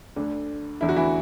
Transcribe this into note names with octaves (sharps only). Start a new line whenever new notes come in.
D2 D3 D4
E2 D3 E4
F#4
E3 E4